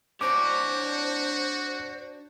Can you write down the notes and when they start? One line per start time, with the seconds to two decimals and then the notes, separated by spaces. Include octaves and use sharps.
0.21 D4 F#4 C5 C#5 D6